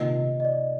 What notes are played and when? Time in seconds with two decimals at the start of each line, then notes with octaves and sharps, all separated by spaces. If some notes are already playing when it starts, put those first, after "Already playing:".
Already playing: C3 D#3 A#3 F4 D#5
0.40 D#5
0.45 D5